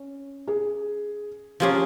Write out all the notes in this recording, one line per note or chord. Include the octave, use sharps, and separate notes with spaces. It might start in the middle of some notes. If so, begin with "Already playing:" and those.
Already playing: C#4
G#4
F3 A#3 C#4 F4 G4 G#4